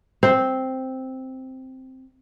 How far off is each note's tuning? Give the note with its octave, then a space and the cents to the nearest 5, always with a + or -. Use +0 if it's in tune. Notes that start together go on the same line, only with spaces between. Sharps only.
C4 +0 C5 +0